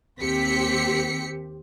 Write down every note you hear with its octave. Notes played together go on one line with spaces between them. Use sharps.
D#2 C4 G4 B6 C#7